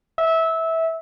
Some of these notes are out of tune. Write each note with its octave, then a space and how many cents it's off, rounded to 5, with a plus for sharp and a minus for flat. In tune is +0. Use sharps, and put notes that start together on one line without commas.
E5 -20